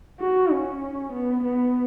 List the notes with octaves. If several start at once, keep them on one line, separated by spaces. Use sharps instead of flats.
F#4
C#4
B3
B3